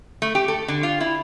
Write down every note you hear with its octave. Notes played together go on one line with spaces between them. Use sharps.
A3
G4
A4
D3
F4
E4